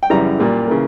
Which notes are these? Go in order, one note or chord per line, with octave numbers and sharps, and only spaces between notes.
G5
F#2 C#3 E3 G3 A#5
A#2 G3 A#3
C#3 E3 A#3